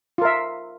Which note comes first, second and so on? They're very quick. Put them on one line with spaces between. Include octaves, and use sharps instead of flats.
F4 A#4 E5